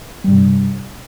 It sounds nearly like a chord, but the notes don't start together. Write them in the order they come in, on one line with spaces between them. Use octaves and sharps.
G3 G2 C3